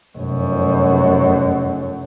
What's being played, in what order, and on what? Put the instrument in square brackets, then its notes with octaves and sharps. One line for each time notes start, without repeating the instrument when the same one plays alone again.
[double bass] F1 F#2